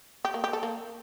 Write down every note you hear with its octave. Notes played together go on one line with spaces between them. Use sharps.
G4
A#3
G4
A4
A#3